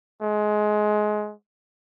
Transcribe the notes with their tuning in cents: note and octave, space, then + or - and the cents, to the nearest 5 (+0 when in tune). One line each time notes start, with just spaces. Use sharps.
G#3 +20